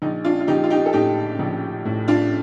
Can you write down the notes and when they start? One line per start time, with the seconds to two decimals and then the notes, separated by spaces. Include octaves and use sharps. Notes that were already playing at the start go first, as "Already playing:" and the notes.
0.02 A#1 D#4
0.25 D4 F4
0.40 F4
0.47 A#1 D#4 G4
0.64 F4
0.70 D#4 G4
0.86 A4
0.93 A2 D#4 G4
1.39 A#1
1.85 A2
2.08 D4 F4